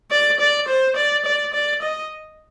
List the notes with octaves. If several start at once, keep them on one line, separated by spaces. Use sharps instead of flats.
D5
D5
C5
D5
D5
D5
D#5